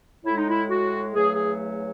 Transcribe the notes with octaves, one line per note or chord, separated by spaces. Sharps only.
A2 G#3 E4
D#4
E4
F#4
E2 C#3 F#3 A3 G#4
G#4